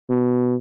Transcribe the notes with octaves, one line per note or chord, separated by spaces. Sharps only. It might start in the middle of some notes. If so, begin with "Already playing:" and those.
B2